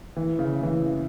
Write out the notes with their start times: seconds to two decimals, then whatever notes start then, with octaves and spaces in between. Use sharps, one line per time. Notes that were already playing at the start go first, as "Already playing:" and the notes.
0.16 E3
0.39 C#3
0.63 E3